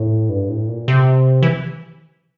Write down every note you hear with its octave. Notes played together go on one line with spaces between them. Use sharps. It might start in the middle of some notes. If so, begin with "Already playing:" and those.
Already playing: A2
G2
A2
A#2
C3
E3